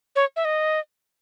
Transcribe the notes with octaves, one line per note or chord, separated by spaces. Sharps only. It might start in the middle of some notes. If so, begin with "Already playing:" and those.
C#5
E5
D#5